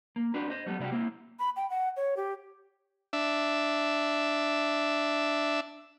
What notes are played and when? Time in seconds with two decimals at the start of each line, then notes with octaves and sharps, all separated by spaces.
0.16 A#3
0.34 C4 D4 F#4 B4
0.50 C5 D#5
0.66 F#3 G3 A3 B3
0.79 C3 G3 E4 F#4 G4
0.92 A#3 C4 E4
1.39 B5
1.56 G5
1.70 F#5
1.97 C#5
2.17 G4
3.13 D4 E5